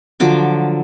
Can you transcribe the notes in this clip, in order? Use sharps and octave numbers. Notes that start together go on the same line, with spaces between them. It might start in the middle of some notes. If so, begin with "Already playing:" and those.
D3 F3 F#3 D6